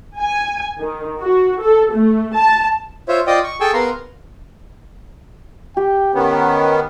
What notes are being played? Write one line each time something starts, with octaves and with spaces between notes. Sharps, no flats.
G#5
D#3
F#4
A4
A3
A5
F4 C5 C#5 E5
F4 D5 D#5 G5 D#6
C#6
G#4 A4 G5 G#5 C#6 E6
B3 A#4 F5 A#5 C6
G4 G5
D#3 B3 C#4